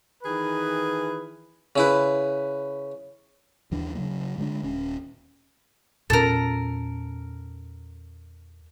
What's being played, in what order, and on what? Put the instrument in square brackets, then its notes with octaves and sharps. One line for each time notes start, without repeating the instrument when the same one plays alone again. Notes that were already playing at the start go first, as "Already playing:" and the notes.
[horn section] D#3 E3 G#4 B4
[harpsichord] C#3 E4 B4
[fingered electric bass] D#2 E3 D4
C#3 F#3 A#3
D3 G#3 D4
D#1 C#4
[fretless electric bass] E2 A#2 C#4 [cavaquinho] A4 A#4